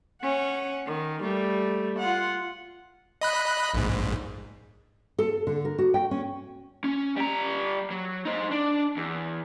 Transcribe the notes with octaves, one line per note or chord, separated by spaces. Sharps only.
C#4 F#5
D#3
G3 A3
F4 F#5
D#5 B5 F#6
A#1 G#2
A4
D3
A#4
F#4
G5
C#4
C#4
G3 A#5
F#3
D#4 C5
D4
E2